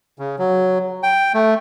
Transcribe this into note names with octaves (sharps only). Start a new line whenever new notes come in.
C#3
F#3
G5
A3